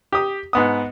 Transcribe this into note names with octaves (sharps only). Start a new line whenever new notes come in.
G4 D#6
G#2 B3 D#6